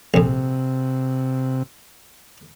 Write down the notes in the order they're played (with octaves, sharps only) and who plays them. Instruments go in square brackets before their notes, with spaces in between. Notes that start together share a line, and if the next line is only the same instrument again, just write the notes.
[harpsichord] A#1 F2 [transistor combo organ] C3